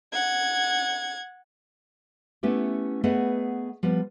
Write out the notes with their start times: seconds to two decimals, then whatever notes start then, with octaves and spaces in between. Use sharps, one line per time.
0.13 F#5 G#6
2.43 A3 B3 C#4 E4 G4
3.04 A3 B3 G#4 B4 D#5 F#5
3.83 F3 G3 B3